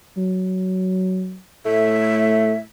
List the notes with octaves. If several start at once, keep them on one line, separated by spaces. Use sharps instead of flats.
F#3
A2 A3 E5